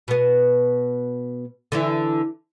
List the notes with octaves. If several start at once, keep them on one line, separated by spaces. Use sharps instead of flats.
B2 B3
D3 E3 E4